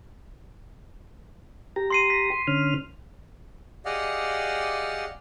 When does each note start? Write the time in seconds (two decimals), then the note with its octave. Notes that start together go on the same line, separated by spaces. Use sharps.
1.76 G4 A#5
1.90 C6 C7 D#7
2.10 B6
2.32 C6
2.47 D3 C#4 F6
3.85 G4 G#4 D5 D#5 F5 F#5